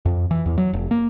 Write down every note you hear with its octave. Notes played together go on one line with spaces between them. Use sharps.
F2
E3
E2
F#3
F1
A#3